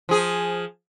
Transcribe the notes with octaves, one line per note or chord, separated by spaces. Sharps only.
F3 G#4